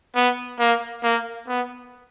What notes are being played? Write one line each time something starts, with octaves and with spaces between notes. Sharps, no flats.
B3
A#3
A#3
B3